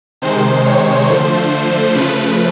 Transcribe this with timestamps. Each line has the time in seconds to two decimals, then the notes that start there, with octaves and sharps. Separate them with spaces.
0.22 C3 D#3 G#3 C5
0.65 C#5
1.09 D3 F3 A3 C5
1.95 C#3 F3 A3 B4